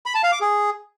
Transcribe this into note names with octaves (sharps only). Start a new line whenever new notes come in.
B5
A5
F5
D6
G#4